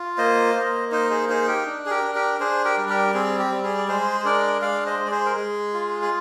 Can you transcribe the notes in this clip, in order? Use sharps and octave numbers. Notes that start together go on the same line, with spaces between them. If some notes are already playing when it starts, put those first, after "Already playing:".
Already playing: F4
A#3 C5 D#5
A#3
D#4 C5 D#5
G#4 C5
D#4 G#4 C5
G4 A#4
D4
G#4
G4 A#4
D4
G4 A#4
D4 G#4 C5
G4 A#4
G3
G4 A#4
C4 G#4
G4
G3
G#4
D5
G#3 G#4 C5
C5
D4 A#4 D5
G#3 D5 F5
C5 D#5
G#3
D5
G#4 C5
A#4
G#3 G#4
F4
G#4